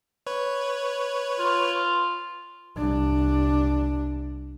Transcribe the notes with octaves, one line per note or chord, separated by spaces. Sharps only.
B4 C#5
F4
C2 D4